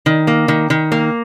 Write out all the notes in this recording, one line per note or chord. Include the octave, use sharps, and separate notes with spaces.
D#3
A#3
D#3
D#3
A#3